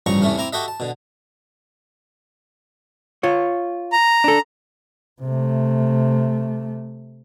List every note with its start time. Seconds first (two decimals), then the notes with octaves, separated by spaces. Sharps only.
0.06 A1 G2 C#3 F3 A#5 C#6
0.22 E2 C3 E3 A3 C#4
0.38 C4 E4 A#5 D6
0.53 F#4 G4 A4 D#5 E5
0.68 A5
0.80 B2 D3
3.23 F4 C#5
3.92 A#5
4.24 D4 A4
5.22 C3 A3